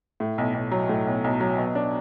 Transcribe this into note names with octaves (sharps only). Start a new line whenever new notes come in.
A2
B1
B1
F#3
A2
B1
B1
F#3
B2
D4